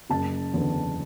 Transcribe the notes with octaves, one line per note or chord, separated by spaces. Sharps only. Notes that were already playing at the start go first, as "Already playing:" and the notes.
F#1 A5
E2 D3